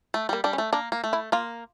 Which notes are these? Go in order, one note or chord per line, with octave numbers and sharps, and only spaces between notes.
A3
G3 A#3
G3 D4
C#4
A3
A#3 D4
A#3
A3
E4
A#3 F4